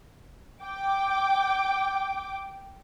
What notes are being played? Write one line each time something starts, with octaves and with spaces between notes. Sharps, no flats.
G5 D6